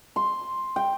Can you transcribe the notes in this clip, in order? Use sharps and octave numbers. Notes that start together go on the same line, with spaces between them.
C6
G5